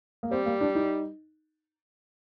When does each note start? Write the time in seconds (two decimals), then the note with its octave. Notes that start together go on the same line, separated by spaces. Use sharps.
0.23 A#3
0.31 G3 C4
0.46 A#3
0.61 D4
0.75 D#4